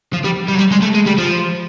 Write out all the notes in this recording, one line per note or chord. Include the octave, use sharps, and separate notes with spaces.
F3
G3
G3
F#3
G3
G#3
A3
G#3
G3
F3